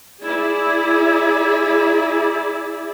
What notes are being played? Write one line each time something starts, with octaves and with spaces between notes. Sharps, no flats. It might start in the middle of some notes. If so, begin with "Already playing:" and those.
E4 G#4 D5